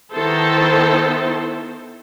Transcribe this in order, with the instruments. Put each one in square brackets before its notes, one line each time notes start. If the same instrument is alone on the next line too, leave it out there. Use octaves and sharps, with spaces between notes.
[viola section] D#3 B3 E4 A4 C5